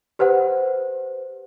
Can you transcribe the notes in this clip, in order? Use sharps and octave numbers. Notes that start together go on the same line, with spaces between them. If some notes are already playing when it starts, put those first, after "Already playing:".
G4 B4 C5 F#5